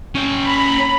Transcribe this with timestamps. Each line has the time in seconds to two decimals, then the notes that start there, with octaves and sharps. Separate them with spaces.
0.15 C#4 G5
0.44 A#5 B5